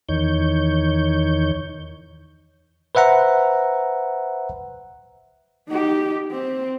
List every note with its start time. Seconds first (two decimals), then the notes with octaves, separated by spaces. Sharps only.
0.09 E2 D#3 C#5 G6
2.95 B4 C5 E5 F#5 A#5
5.69 D#4 G4
6.31 C4